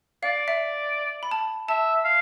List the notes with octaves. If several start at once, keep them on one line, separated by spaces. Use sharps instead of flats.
D5 F5
E5
B5
A5
E5 A5
F5